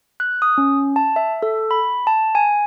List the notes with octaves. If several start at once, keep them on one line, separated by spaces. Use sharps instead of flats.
F#6
D#6
C#4
A5
E5
A4
B5
A5
G#5